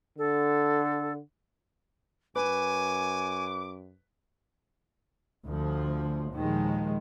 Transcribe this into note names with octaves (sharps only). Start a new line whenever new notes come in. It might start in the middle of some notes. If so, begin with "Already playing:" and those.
D3 A4
F#2 B4 G#5 D6
D2 F3
D#2 A#2 D#3 F3 G#3